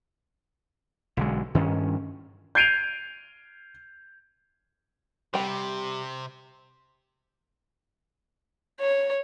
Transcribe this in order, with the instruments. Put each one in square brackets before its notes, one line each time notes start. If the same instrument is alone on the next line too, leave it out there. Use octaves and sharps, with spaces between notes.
[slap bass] B1 D3 G#3
G2 D#3 C#4
[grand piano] G6 G#6 C7 D7 D#7 F7
[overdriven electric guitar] C3 [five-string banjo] G3 G5
[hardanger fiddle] C#5